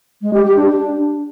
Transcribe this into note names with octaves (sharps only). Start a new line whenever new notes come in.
G#3
G4
G4
D4